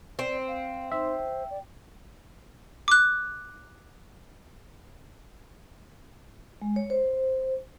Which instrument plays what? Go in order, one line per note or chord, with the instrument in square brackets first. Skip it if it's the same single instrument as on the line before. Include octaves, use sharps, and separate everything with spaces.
[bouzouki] C4 [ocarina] D5
[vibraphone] C5 [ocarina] F5
[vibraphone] D#4 C6 [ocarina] C5 [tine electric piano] E5
[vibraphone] G5
[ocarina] D5
[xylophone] D6 F#6
[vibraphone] G#3
C#5
C5